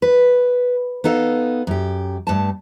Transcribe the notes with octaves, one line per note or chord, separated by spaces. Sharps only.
B4
B3 D#4 A4 F5
F#2 G4
G2 A3 A5